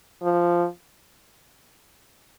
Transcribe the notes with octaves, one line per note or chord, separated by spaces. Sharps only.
F3